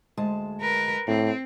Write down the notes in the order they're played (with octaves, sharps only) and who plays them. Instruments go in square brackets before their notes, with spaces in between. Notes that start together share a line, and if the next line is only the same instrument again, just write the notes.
[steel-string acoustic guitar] D2 G#3 A5
[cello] A#4 B4
[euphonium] A2 [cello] C4